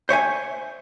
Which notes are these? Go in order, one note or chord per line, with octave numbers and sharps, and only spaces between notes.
C5 C#5 E5 G#5